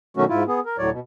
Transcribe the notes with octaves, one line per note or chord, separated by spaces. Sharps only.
B2 D#3 F#3 A3 C#4 F#4
G#2 E4 F4
B3 G#4
A#4
D2 A2 F#3 C#5 D5
B2